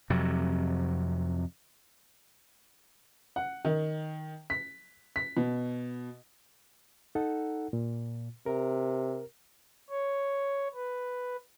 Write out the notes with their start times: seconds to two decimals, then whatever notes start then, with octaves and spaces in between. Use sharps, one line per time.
0.10 F2 C3 F#3
3.36 F#5
3.65 D#3
4.50 B6
5.16 B6
5.37 B2
7.15 D#4 A4 F#5
7.73 A#2
8.46 C3 A#4
9.90 C#5
10.75 B4